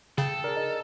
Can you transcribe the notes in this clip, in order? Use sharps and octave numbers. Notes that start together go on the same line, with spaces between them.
C#3 A4 G5
D4 G#4 A#4
D#4